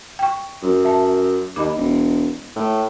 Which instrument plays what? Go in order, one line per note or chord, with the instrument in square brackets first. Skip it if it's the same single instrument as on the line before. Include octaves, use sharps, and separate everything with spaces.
[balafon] G5 C#6
[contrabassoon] F#2
[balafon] E5 A5
[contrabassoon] D#2 [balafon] D#5 B5 D6
[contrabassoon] E1
A2